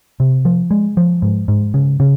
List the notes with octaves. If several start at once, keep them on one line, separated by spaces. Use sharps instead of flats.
C3
F3
G#3
F3
G#2
G#2
C#3
C#3